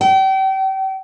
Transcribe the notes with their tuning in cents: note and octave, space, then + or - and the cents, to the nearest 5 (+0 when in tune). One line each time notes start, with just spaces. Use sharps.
G5 -35